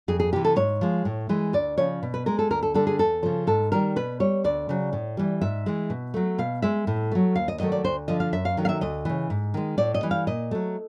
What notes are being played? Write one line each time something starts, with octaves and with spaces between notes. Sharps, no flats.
F2 G#4
G#4
C3 E3 G4
A4
G#2 C#5
F3 G#3
A2
E3 G#3
D2 D5
C#3 F3 C#5
B2
B4
G#3 A#4
A4
D2 A#4
A4
D3 G3 A4
G#4
E2 A4
C#3 F3
G#2 A4
D#3 G3 A#4
B2 B4
G3 C#5
D2 D5
C#3 F#3
A2
E3 G3
G#2 E5
E3 G#3
B2
F#3 A3
B2 F5
G#3 E5
A2
F#3 A3
D#2 F5
D#5
D#3 F#3 A3 D#5
D5
D2 C5
D3 F3 D#5
F5
F#2 E5
F5
D#3 F#3 A3
F5
E5
D2 D#5
C#3 E3
G#2
D#3 G#3
A2 D5
D#5
E3 G3
F5
A#2 D#5
F#3 A3